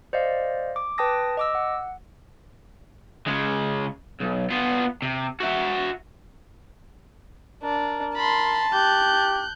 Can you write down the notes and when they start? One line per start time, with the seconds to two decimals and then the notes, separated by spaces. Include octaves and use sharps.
0.13 C5 D5 D#5 F5
0.76 D6
0.98 B4 G5 A5 D#6 A#6
1.37 D#5 D6 E6
1.55 F#5
3.27 C#3 G#3
4.20 B1
4.50 B3 F4
5.02 C3
5.40 F#4 E5
7.63 D4 A#4
8.16 A5 B5 C6
8.73 G4 F#6 G6